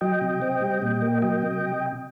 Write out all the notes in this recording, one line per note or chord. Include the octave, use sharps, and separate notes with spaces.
F#3 D#5 G5
C3
C4
G3
A#2
A#3
F#3 D#5 G5
C3